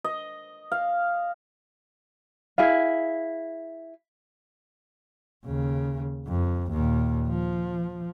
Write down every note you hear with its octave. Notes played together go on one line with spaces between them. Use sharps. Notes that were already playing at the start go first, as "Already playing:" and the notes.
D#5
F5
E4 G#4 F5
D#2 C#3
F2
D#2 A#2
F3